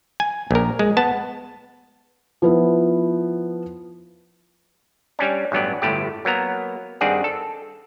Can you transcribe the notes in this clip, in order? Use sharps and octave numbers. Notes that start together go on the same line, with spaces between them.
G#5
A#1 A#4
G#3
B3 A5
F3 B3 E4
G3 C#4 D4
A1 G2 F#3 B3 D5
G1 A2 A3 G4
F#3 A#3 B3 A#5
G2 D#3 C4 G#4 D5 F#5
A4